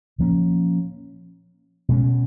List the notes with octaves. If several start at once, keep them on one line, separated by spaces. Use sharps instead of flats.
A#2 F3 A#3 C#4
B2 G#3 C#4